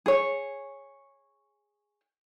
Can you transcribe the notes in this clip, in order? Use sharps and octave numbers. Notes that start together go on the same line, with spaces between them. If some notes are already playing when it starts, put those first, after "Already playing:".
G#4 C#5